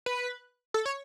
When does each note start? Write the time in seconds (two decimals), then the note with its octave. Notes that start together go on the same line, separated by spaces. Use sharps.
0.06 B4
0.74 A4
0.86 C#5